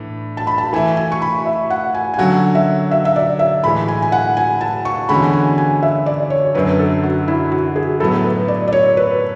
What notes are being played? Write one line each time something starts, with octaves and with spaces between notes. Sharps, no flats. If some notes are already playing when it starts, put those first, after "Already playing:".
Already playing: A2 E3 D4
A5
B5
A5
E3 A3 E4 G#5
G#5
C#6
B5
E5
F#5
G#5
G#5
D3 F#3 C#4 F#4 F#5
E5
E5
E5
D5
E5
A2 E3 G#3 B5
G#5
G#5
F#5
G#5
A5
C#6
E2 D3 G#3 C#4 F#4 B5
G#5
G#5
E5
D5
C#5
F#2 D3 F#3 B4
A4
F#4
E4
F#4
G#4
A2 F#3 B3 A4
B4
D5
D5
C#5
B4